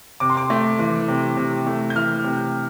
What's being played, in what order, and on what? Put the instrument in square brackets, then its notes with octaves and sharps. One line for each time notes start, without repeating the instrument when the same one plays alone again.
[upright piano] C3 D6
C6
D6
A3
E3
C3
C3
A3
G6
E3 F6
C3